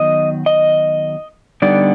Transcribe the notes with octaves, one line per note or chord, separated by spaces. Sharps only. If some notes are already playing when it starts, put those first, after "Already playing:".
Already playing: D#3 F#3 B3 D#5
D#5
D3 G3 B3 D#4 D5